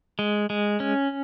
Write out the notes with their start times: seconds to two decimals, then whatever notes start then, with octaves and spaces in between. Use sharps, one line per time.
0.19 G#3
0.50 G#3
0.80 C#4